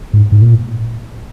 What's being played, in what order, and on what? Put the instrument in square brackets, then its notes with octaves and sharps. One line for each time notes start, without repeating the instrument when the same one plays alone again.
[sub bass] G#2
G#2
A#2